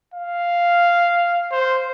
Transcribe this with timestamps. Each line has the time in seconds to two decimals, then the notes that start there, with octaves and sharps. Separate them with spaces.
0.14 F5
1.51 C5